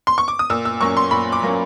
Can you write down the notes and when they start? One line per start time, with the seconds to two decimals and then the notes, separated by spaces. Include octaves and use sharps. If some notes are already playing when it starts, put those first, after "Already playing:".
0.07 C6
0.18 C#6
0.28 D6
0.39 D#6
0.50 A#2 E6
0.65 E6
0.81 F#3 A#3 C#4 C#6
0.97 C6
1.11 A#2 B5
1.32 D6
1.42 F#3 A#3 C#4